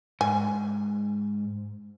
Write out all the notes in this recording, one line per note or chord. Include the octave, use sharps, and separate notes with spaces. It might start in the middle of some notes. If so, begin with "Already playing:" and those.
G#2 G#5